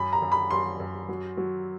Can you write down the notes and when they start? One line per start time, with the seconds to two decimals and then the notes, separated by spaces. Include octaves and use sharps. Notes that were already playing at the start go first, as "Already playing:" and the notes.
Already playing: F#2 B5
0.13 A#5
0.22 F#2
0.32 B5
0.51 F#2 C6
0.80 F#2
1.09 F#3
1.37 F#3